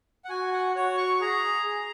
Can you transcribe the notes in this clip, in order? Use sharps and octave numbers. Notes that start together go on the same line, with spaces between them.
F#5
F#4 G#5
F#5
F#4 C#5
C#6
G#4 A#5
G#4